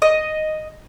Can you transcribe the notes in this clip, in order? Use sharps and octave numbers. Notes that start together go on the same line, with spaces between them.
D#5